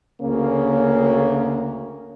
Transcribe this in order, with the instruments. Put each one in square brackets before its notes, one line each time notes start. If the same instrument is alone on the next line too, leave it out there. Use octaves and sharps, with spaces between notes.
[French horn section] D2 C#3 A#3 C#4